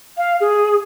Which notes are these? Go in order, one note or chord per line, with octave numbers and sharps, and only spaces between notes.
F5
G#4